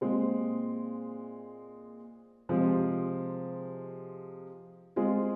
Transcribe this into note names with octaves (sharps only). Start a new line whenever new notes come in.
A#2 G#3 C4
C3 F3 G#3 C4
G#3 C4 F4 G#4